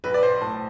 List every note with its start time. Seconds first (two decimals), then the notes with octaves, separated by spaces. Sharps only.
0.04 B1 B4
0.14 D5
0.23 C5
0.41 A2 A5